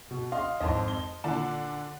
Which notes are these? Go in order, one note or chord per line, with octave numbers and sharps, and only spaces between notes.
B2
D#5 F5 C6
G#1 F2 D#5 A5 C6
G7
A#2 D3 D4